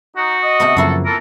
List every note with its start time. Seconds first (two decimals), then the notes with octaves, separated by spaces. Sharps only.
0.17 D#4 F#4
0.43 D#5
0.60 C3 A3 B3
0.77 F#2 C#3 F3 A#3 E4 F4 A4
1.06 E3 A4 A#4